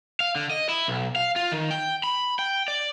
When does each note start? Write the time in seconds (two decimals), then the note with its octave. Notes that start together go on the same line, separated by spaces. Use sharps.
0.20 F5
0.36 D3
0.51 D#5
0.69 E4
0.88 B1
1.16 F5
1.36 F4
1.52 D#3
1.71 G5
2.04 B5
2.39 G5
2.68 D5